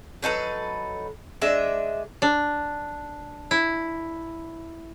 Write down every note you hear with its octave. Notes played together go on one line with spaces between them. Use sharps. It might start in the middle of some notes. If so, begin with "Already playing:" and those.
F#3 D#4 A4 B4
G#3 D4 D#5 E5
D4
E4